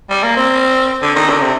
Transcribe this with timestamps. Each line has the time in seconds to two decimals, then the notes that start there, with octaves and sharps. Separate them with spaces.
0.10 G3
0.24 A#3
0.36 C4
1.02 D3
1.16 D#3
1.29 D3
1.41 C3